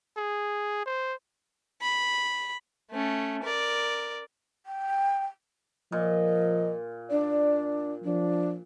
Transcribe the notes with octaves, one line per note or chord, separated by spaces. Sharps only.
G#4
C5
B5
A3 C#4
A#4 D5
G5
A#2 F3 D#5
D4 D5
F3 D4